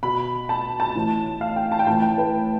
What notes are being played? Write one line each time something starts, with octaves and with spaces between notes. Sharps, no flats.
B2 B5
A5
A5
A2 E3
F5
G5
A5
G5
A2 E3 A5
G5
B4